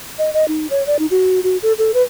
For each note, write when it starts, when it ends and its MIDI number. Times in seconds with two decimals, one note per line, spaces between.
0.18 0.32 75
0.33 0.45 75
0.48 0.67 63
0.70 0.85 73
0.86 0.97 74
0.99 1.06 63
1.11 1.40 66
1.43 1.57 66
1.62 1.72 69
1.78 1.94 69
1.94 2.02 71